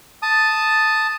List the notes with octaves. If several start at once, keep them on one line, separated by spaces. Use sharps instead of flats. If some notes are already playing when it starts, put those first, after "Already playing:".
A5 D#6